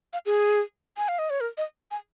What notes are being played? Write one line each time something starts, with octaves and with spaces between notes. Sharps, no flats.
F5
G#4
G#5
F5
D#5
C#5
A#4
D#5
G#5